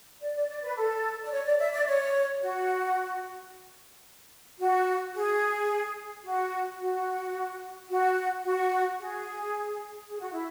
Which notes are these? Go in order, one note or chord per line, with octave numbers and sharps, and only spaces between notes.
D5
D5
D5
B4
A4
D5
C#5
D5
E5
D5
C#5
F#4
F#4
G#4
F#4
F#4
F#4
F#4
G#4
G#4
F#4
E4